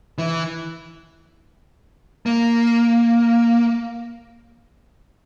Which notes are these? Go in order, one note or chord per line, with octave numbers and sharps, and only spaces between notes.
E3
A#3